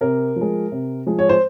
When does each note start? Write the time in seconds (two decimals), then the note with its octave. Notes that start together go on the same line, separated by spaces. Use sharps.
0.01 C3 A#4
0.36 F3
0.41 G#3
0.72 C3
1.07 F3 G#3
1.19 C#5
1.29 C5